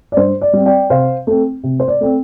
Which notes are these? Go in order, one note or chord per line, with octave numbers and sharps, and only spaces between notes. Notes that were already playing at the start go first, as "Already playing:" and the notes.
D5
G2 C5
D5
G3 C4
D5 G5
C3 C5 F5
A3 C4
C3
C5
D5
A3 C4